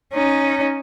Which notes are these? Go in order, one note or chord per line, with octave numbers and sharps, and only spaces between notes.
C#4 D#4